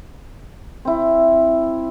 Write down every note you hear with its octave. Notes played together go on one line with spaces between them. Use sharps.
C4 E4